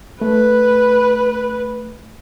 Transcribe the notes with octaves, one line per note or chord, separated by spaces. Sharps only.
A3 B4